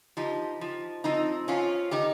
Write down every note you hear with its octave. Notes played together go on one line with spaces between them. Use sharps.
F3 D#4 G4
F3
F3 C4 D#4
F3 C#4 F4
D#3 D#4 G4